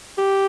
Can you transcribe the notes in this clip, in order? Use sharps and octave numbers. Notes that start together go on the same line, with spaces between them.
G4